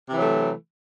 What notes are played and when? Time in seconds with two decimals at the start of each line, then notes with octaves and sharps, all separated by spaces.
0.09 C3
0.13 E3
0.16 F#3
0.20 A3